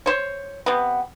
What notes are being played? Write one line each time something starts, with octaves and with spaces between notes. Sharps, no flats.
C5 C#5
C3 B3